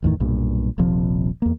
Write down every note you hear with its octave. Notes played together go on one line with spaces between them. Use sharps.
G1 E2 A2 D#3
B1 G2 A#2
D#1 A#1 C3 F3
E2 A#3